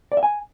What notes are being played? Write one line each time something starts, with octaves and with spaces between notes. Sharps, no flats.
D5
E5
G#5